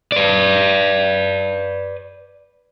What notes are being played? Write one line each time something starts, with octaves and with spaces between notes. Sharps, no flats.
B4 D5